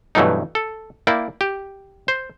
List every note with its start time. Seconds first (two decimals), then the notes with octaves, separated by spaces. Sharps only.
0.15 G2 B2 E3 F#3 A3 D#4
0.55 A4
1.07 A#3 E4 D5 G5
1.41 G4
2.08 C5